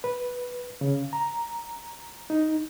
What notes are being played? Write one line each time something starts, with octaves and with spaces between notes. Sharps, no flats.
B4
C#3
A#5
D#4